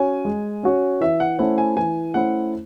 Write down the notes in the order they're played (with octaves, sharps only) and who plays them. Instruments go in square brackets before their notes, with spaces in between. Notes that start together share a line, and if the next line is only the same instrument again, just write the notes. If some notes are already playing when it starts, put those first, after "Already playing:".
Already playing: [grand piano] C#4 F#4 C#5 [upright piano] G#5
[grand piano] G#3
C#4 F#4 C#5
[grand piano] E3 [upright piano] E5
[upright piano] F#5
[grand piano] A3 C#4 E4 C5 [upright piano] F#5
[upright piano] G#5
[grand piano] E3 [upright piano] G#5
[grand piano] A3 C#4 E4 C5 [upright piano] F#5